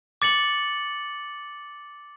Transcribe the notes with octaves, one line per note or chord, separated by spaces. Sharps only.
D6 A6 C#7 F#7